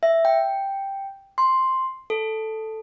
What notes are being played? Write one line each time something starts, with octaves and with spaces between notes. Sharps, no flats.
E5
G5
C6
A4